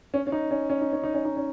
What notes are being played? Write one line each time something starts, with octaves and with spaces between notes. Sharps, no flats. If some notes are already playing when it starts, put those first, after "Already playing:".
C#4
C#4
D#4
C#4
C#4
D#4
C#4
D#4
C#4
D#4
C#4